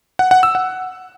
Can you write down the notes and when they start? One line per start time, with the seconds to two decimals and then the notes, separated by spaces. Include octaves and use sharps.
0.19 F#5
0.31 F#5
0.43 E6
0.55 F#5